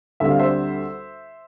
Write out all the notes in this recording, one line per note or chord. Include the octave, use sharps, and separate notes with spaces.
D2 D3 G3 C4 E5
F5
C5 E5